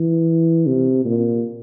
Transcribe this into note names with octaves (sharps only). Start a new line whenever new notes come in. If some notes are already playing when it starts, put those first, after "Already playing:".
Already playing: E3
C3
A#2